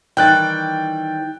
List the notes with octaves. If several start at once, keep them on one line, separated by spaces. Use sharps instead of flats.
D#3 E3 G3 G5 F#6 A6